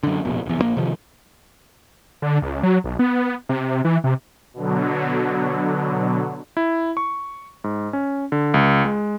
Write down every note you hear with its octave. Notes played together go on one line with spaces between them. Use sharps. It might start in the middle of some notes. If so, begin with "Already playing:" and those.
F#2 D3
F1 A#1 B2
F1 E2
A#1 D#3 A#3
C3 D#3 F3
D3
C#2
F#3
B1
B3
C3
E3
C3
B2 D3 F#3
E4
C#6
G#2
C#4
D3
C#2
G#3